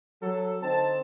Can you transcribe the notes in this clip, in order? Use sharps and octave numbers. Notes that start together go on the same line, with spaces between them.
F#3 A4
D3 C4 D#4 A5